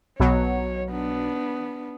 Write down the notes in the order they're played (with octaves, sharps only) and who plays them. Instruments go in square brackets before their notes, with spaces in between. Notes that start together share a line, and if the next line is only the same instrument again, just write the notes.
[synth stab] B1 B2 F#3 [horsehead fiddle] C#5
[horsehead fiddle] B3 D4